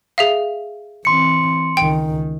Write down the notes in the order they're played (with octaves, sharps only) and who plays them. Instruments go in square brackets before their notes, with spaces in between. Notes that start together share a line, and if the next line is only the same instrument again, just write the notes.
[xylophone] G#4 E5 F5
[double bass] E3 C4 [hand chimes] C6 C#7
[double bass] C#2 D#3 [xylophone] G5